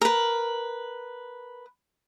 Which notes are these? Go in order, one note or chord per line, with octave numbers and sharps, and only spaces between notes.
A#4 B4